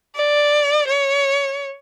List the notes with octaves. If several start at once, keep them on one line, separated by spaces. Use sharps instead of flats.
D5
C#5